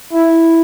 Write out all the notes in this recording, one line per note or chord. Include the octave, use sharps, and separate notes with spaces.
E4